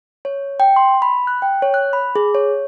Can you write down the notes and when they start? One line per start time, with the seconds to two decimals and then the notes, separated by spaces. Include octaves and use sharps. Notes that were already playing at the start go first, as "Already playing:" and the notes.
0.25 C#5
0.60 G5
0.76 C6
1.02 B5
1.27 F#6
1.42 G5
1.62 C#5
1.74 F#6
1.93 B5
2.16 G#4
2.35 C#5